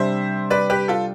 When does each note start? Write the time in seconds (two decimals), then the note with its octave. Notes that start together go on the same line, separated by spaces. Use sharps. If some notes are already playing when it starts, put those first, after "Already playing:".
Already playing: C3 G3 D4 C5 E5
0.50 B4 D5
0.70 G4 B4
0.88 F4 A4